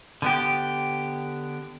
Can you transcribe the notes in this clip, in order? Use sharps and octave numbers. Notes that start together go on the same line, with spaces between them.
D3 B3 G4